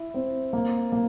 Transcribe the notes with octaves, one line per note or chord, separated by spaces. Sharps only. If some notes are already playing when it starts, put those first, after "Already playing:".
Already playing: E4
C4
A#3
A#3